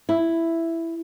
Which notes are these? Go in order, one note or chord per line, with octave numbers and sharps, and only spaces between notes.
E4